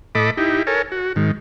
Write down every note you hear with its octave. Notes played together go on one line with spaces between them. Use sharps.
A2 A4 D#5 B5 D6
D#4 E4 G4
A4 A#4 C#5 G#5
F#4
G#2 D#3